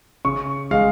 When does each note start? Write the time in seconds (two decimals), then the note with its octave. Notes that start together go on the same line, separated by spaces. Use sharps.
0.25 C#3 C#6
0.71 G#3 F5